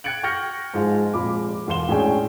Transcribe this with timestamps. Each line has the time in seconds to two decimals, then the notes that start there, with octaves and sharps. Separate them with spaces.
0.04 G5 F#6 G#6 C#7 D7 F#7
0.23 G5 C#6 F6 G6 A#6 C#7
0.74 G#2 F3 G#3 F4 G#4
1.13 F1 A#2 G#3 B5 D6
1.67 E1 E2 F5 C6 E7 G7
1.89 A2 G#3 C#4 D4 G#4 G5